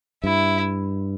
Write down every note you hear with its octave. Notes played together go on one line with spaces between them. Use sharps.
G2 E4